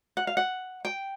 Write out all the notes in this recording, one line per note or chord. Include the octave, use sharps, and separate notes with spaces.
F#5
F5
F#5
G5